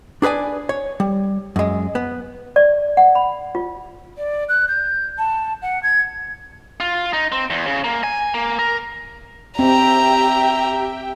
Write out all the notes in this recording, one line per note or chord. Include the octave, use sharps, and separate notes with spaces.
D4 G#4 B4 D5 G#5
C#5
G3
F#2 G#3
B3
D5
F#5
B5
F4
D5
F#6
G6
A5
F#5
G#6
F4
D#4
C4
E2
C#3
A#3
G#5
A#3
A#4
C4 G4 E5 G5 A#5